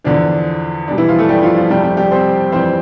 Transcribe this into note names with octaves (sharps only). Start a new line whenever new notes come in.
E2 D3 F3 D4
B2 G3 D4
E3 E4
F3 F4
A3 A4
G3 G4
F3 F4
F3 F4
F2 C3 F3 G3 A3 G4
G3 G4
G3 G4
C4 C5
F2 E3 G3 C4 C5